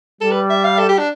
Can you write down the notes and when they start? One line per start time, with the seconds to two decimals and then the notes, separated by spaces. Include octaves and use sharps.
0.21 G3 A4
0.31 B4
0.50 E5
0.64 F5
0.79 A4
0.89 G4
0.98 D4